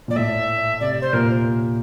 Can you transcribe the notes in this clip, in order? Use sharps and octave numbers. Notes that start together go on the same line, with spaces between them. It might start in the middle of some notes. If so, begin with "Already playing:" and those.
A#2 D5
A2 E5
C3 D5
C5
A#2 A#4